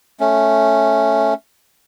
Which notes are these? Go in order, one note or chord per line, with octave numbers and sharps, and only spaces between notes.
A3 C#4